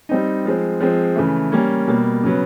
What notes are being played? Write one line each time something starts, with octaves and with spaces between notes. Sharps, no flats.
G3 C4 D#4
F3 G#3 C4
F3 G#3 C4
C#3 E3 A3
G3 A#3 C#4
B2 G3 A#3
C#3 F#3 B3